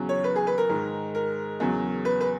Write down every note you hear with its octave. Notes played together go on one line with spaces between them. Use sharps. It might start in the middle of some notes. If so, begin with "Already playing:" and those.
Already playing: E2 C#3 F#3
C#5
B4
G#4
B4
A#4
G#2 D#3 G#3
A#4
E2 C#3 F#3
B4
B4